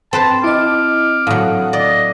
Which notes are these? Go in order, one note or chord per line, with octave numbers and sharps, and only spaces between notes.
C4 B4 C5 A5
E4 D#5 D6 F6
A2 F#3 F5 D#6 F#6
D5 D#5